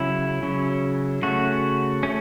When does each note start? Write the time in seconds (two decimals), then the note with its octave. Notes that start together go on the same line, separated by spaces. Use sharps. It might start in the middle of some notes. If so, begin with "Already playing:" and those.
Already playing: C#3 F#3 C#4 E4
0.43 C#3 F#3 C#4
1.22 C#3 A3 C#4 F#4
2.03 A3 C#4